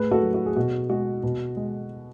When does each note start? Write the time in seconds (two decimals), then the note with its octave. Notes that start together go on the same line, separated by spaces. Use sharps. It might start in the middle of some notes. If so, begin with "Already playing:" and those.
Already playing: A2 G#4 B4
0.11 F#4 A4
0.23 F#3
0.34 F#4
0.46 G#4
0.56 B2 F#4
0.90 G#3 F#4
1.23 B2
1.57 G#3